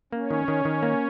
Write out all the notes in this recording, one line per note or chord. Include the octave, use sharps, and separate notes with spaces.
A#3 C#4
D#3
D#3
D#3
A#3